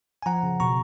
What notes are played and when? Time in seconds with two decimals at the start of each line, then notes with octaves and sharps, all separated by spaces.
0.22 G#5
0.26 F3 F#5 A#5
0.43 C#3
0.60 B2 A#5 C#6